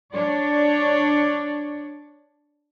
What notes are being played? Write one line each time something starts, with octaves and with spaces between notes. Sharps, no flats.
D4 C#5 D5